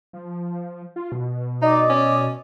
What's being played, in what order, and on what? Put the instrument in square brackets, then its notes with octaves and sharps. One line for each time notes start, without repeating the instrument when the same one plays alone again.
[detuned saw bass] F3
F4
B2
[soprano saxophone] D#4 [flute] D5 [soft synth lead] D#5
[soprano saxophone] C#4